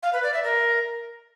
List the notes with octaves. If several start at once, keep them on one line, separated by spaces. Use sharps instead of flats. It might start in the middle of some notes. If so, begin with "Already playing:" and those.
F5
B4
D5
E5
A#4